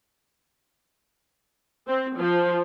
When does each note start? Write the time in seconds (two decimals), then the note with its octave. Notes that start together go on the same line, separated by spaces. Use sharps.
1.87 C4
2.18 F3